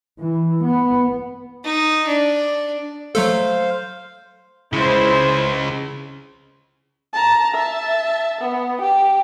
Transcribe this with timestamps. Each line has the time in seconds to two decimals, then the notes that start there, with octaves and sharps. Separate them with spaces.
0.20 E3
0.64 B3
1.64 D#4
2.07 D4
3.15 F#3 A3 A4 C5 F5
4.73 C#3 G#3 E4 C5
7.13 A5 A#5
7.54 E5 A5
8.41 B3
8.81 G4